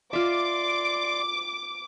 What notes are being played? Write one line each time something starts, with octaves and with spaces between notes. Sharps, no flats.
F4 D5 E5 C6 D6